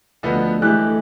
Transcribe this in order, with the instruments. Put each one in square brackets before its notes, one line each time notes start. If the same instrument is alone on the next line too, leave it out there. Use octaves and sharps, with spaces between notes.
[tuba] D2 [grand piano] D3 F3 B3 [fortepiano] D#5
[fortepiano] E3 G#3 F#6 [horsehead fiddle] A3 [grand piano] G4